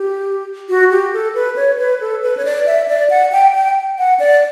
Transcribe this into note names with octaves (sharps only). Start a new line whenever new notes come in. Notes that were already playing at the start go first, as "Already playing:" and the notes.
Already playing: G4
F#4
G4
A4
B4
C#5
B4
A4
B4
C#5
D5
E5
D5
F#5
G5
G5
F#5
D5